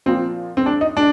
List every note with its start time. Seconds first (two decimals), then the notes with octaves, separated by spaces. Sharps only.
0.06 A#2 F3 C4
0.57 C4
0.66 D4
0.81 D#4
0.97 D4